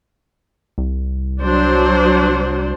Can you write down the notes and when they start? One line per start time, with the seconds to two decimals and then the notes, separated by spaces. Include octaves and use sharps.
0.78 C2
1.42 F#3 D4 C5